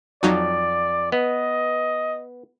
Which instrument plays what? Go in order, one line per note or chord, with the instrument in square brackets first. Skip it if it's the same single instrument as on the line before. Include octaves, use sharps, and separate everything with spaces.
[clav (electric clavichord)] F2 [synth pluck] F#3 D#4 F#4 [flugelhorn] D5
[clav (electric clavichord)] B3 [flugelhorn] D#5